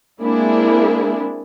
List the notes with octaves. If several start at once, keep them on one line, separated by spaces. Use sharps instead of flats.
G#3 A#3 C4 D4 E4 G#4